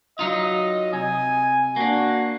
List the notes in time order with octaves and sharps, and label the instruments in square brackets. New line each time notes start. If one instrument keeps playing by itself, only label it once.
[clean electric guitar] F#3 D#4 F4 [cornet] D#5
[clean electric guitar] C3 [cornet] G#5
[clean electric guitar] A#3 D4 [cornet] F#4